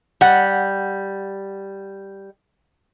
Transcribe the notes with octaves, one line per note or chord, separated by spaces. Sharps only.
G3 F#5